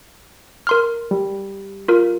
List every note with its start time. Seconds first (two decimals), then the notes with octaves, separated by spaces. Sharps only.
0.67 A#4 C6 F6
1.11 G3
1.88 F4 A#4